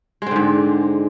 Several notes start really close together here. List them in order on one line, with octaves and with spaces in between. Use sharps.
G#3 C4 D3 G#2